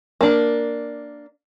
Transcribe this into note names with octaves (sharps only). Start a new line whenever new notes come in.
A#3 D4